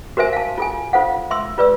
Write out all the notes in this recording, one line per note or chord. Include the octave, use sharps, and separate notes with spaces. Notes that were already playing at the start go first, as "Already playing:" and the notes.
F#4 A#4 C5 E5 G#5
F5 A5
F4 A4 G#5
F4 A4 C5 F5 F#5
E5 C6 E6
F4 B4 D5 E6